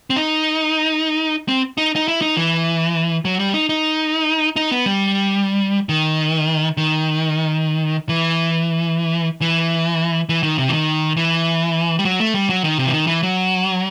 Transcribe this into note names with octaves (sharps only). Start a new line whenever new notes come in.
C4
D#4
C4
D#4
D#4
E4
D#4
E3
F#3
G3
D#4
D#4
D#4
B3
G3
D#3
D#3
E3
E3
E3
D#3
C3
E3
D#3
E3
G3
F#3
A3
G3
F#3
D#3
C3
E3
D#3
E3
F#3